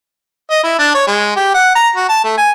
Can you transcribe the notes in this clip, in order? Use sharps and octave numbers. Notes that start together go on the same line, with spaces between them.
D#5
E4
D4
C#5
G#3
G4
F#5
A#5
F#4
A5
A3
G#5